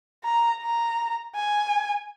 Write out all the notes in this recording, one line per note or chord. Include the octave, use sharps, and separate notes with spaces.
A#5
A#5
G#5